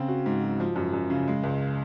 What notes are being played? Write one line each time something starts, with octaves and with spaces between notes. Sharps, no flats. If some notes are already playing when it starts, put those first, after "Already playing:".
Already playing: C#3 C4
F#4
G#2
F#3
F3
F#2
F#2
C#3
G#3
C#2